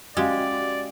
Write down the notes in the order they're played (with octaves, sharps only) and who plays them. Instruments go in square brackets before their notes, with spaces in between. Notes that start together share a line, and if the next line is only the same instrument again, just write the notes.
[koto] G#3 [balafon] C#4 F5 [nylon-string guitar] F#4 G4 [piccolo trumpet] D5